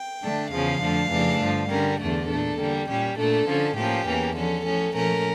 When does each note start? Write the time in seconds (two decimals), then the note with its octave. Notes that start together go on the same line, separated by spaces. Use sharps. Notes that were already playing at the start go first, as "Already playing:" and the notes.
Already playing: G5
0.22 D3 A3 D4
0.51 E2 C#3 F3 C#4 F5
0.81 F2 D3 F3 A3 D4
1.10 F2 C#3 E3 A3 D4
1.40 G2 D3 F3
1.69 D3 G3 C#4 A#4
2.00 E2 D3 A3 D4 A4
2.28 A#2 A3 D4
2.57 D3 G3 A#3
2.87 A#2 G3 C#4 G4
3.17 A#2 A3 D4 A4
3.47 D3 F3 C#4
3.76 A2 F3 A#3 C#4 G4
4.05 E2 E3 A#3 C#4
4.35 D3 F3 C#4 A4
4.64 A2 F3 C#4
4.93 A#2 F3 A3 C#4 A#4